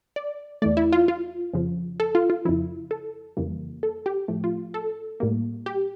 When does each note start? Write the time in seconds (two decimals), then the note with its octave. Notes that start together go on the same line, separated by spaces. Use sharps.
0.16 D5
0.62 E2 E3 A3 D5
0.77 E4
0.92 F4
1.08 F4
1.53 F2 C#3 F3
2.00 A4
2.15 F4
2.30 F4
2.45 F2 C#3 F3 E4
2.91 A4
3.37 F2 C#3 E3 G3 A#3
3.83 A4
4.06 G4
4.28 A2 F3 A3
4.44 F4
4.74 A4
5.20 A2 G3 A#3
5.66 G4